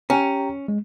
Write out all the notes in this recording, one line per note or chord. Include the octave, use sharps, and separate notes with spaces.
C#4 G4 G5 A#5
G#3